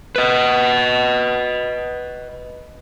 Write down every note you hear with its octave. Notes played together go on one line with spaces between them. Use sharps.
B4 D#5